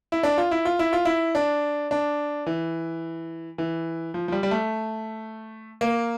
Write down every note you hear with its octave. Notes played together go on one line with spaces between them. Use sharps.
E4
D4
F4
E4
F4
E4
F4
E4
D4
D4
E3
E3
F3
F3
G3
G3
A3
A#3